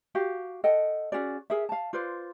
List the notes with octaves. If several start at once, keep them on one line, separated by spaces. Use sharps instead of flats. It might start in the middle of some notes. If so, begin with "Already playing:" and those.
F#4 G4 F5
A4 D#5 F#5 G5
C#4 F#4 G#4 D5
G#4 A#4 E5
F5 A5
F4 B4 C5 D5